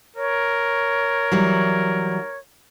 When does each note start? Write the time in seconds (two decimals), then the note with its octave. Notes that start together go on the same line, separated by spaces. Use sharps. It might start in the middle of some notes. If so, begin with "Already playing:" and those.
0.16 A#4 C#5
1.32 E3 F#3 G3